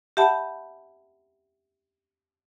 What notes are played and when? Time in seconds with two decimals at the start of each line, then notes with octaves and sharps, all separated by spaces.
0.17 G4 E5 F#5 A5 B5